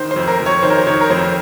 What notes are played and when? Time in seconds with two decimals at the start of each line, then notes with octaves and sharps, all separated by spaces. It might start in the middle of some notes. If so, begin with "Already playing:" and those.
Already playing: D#3 C5
0.11 C5
0.16 F2
0.28 A#4
0.40 F2
0.46 C#5
0.63 D#3 C5
0.70 A#4
0.78 C5
0.87 D#3 C#5
1.01 A#4
1.10 F2 C5